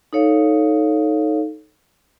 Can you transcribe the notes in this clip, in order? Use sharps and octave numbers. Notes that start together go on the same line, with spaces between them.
D#4 A4 C#5 F5